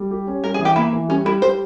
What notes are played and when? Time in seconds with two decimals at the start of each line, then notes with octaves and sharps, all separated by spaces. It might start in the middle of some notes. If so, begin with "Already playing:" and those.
Already playing: G3
0.11 G4
0.27 C#4
0.44 G3 A#4
0.54 G#4
0.59 E3
0.65 G4
0.76 A#3 E4
0.93 E3
1.09 G3 C#4
1.25 G3 E4
1.42 G3 C5